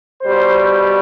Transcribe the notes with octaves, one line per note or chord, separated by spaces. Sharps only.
B2 G3 C5